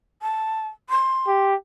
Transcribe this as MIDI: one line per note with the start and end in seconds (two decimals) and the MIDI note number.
0.22 0.68 81
0.90 1.46 84
1.28 1.55 67